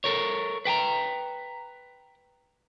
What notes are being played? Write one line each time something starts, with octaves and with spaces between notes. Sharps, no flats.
A4 A#4 C#5
B4 G5 G#5 A#5